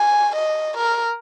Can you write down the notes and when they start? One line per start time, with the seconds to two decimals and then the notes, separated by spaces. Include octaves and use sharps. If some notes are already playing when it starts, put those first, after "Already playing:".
Already playing: G#5
0.36 D#5
0.77 A#4